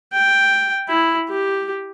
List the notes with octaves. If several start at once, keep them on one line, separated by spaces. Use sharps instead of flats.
G5
E4
G4